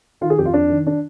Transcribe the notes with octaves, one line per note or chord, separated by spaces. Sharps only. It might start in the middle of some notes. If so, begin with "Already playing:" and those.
D#3 F4
G#4
F2 G4
F4
F2 D4
D#3
D4